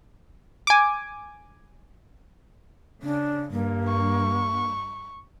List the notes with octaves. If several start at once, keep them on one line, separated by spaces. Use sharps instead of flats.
G#5 D6
C#3 D4
G2 A#3
C#6